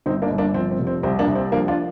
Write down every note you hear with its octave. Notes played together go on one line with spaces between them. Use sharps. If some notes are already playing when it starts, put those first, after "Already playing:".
G1 C4 D#4
A#3 D4
G1
A#3 D4
F3 C4
C4
F1
C4
C2 C4
A#3 D4
C2
C4
F3 A#3 D4
D4 F4